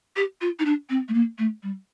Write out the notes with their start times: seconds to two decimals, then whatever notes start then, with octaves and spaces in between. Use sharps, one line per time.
0.16 G4
0.41 F4
0.59 D#4
0.65 D4
0.90 C4
1.08 A3
1.13 A#3
1.38 A3
1.63 G3